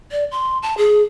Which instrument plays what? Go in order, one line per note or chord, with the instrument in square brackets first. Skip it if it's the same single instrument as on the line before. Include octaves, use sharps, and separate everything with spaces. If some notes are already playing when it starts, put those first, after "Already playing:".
[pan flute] D5
C6
A5
G#4